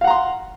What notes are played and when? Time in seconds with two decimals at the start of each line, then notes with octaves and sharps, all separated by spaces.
0.01 F5
0.04 F#5
0.07 A#5
0.10 C6